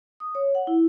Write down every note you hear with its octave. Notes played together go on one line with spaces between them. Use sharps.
D#6
C#5
F#5
E4